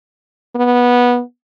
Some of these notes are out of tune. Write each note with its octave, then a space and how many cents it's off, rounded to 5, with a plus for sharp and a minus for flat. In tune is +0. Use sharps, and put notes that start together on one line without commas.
B3 -15